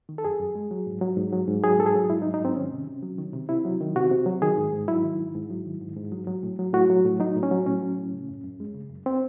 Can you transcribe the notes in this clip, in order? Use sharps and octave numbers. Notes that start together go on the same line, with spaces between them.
D#3
A4
F#2 G#4
F#2
G#3
F#3
G#2
F#3
G#2
F#3
G#2
F#3 G#4
G#2 A4
G#4
F#3
G#2 E4
D#4
F#3
D#4
G#2 C4
D#3 C#4
C3
C3
F#3
D#3
C3
C3 E4
F#3
D#3
C3 F#4
C3
F#3
D#3 G#4
G#2
G#2
F#3 E4
D#3
G#2
G#2
F#3
D#3
G#2
G#2
F#3
F#3
A2
F#3
A2 F#4
F#3
A2
F#3 D#4
A2
C#4
F#3
A2 C#4
F#3
A2
C#3
F#2
F#2
G#3
C#3
F#2
C4